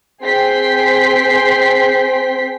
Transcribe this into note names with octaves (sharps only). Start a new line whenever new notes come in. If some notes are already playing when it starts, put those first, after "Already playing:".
C4 G#4 G5 C6 B6